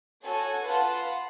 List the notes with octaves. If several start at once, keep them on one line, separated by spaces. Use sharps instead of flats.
F#4 A4 C#5 G#5
F4 B4 F#5 A5